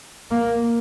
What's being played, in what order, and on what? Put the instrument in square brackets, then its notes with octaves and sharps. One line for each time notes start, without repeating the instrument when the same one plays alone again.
[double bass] A#3